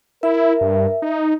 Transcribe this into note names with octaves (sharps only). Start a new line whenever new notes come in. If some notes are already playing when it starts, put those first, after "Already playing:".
E4 A#4 E5
G2
D#4